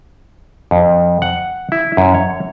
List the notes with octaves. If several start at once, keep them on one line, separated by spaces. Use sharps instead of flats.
F2
F#5
E4
F#2
C#5